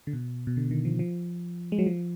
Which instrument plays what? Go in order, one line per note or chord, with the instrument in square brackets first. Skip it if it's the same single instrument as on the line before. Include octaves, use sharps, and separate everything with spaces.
[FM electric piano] D3
B2
B2
D3
D#3
F3
F3
G#3
F#3
F3